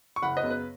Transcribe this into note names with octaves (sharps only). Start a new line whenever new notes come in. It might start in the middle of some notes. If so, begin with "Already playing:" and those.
C#6
F#1 F#5 B5
B4 D#5
F#2 C#3 B3
B4